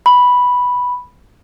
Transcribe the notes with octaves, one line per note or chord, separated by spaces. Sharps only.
B5